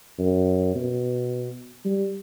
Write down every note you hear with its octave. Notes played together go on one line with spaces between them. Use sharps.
F#2
B2
G3